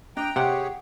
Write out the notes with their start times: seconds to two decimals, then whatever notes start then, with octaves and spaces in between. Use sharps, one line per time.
0.17 D4 D#5 G5 A#5
0.36 C3 G4 G#4 C#5 F#5 G5